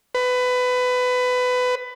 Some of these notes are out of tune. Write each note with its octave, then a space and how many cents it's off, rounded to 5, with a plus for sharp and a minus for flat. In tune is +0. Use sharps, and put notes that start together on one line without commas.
B4 +20